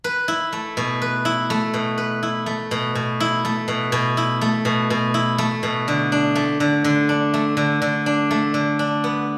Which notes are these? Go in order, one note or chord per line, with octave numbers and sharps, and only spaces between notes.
B4
E4
A3
B2
B4
E4
A3
B2
B4
E4
A3
B2
B2
E4
A3
B2
B2
E4
A3
B2
B2
E4
A3
B2
D3
D4
A3
D3
D3
D4
A3
D3
D3
D4
A3
D3
D4
B3